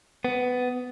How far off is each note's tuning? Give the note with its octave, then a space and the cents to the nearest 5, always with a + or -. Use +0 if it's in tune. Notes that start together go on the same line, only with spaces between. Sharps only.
B3 +15